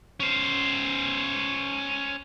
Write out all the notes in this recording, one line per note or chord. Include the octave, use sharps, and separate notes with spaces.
C#4 C5